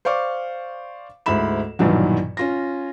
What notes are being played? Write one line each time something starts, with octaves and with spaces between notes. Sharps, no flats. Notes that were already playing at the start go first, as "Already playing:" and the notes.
C5 D5 F5 C#6 D6
D2 G#2 E4 B5 E7
B1 G2 A#2 D#3 E3 F#3
C#4 F4 A#6